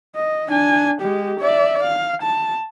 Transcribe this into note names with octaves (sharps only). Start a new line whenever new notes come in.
D#5
D4 G#5
G#3 G4
D5 E5
F5
A5